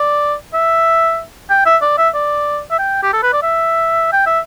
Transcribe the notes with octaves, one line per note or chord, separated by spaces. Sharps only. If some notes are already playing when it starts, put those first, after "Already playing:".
Already playing: D5
E5
G5
E5
D5
E5
D5
E5
G5
G4
A4
B4
D5
E5
G5
E5